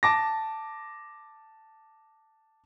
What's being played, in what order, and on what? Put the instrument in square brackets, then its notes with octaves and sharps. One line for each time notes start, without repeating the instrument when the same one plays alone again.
[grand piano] A5 D6 A#6